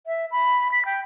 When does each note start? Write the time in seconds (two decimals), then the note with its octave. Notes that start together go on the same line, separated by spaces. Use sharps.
0.07 E5
0.32 B5
0.72 B6
0.86 G5